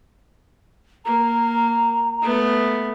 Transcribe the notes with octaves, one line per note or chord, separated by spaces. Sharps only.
A#3 A#5
A3 B3